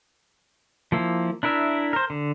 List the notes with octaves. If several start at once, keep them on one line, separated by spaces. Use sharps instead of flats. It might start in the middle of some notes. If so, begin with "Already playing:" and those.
F3 A#3 E4
D4 E4 A#4 E5
A#4 C5
D3